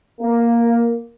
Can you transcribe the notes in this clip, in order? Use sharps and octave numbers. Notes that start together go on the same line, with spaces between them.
A#3